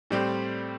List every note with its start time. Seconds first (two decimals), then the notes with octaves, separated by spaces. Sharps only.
0.11 A2 G3 C4 G4